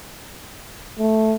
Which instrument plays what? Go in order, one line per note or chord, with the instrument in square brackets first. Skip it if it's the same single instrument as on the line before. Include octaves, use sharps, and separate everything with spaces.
[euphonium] A3